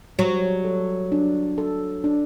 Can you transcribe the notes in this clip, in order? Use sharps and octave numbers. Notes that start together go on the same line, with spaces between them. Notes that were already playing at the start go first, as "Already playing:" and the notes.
F#3 G3
A4
D4
A4
D4